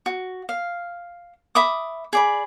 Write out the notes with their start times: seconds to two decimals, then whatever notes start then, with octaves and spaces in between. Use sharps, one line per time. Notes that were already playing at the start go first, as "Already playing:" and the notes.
0.06 F#4
0.49 F5
1.55 E5 B5 D6 D#6
2.13 G#4 D5 B5